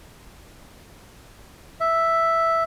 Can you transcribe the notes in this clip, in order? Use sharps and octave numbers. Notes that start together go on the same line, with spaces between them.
E5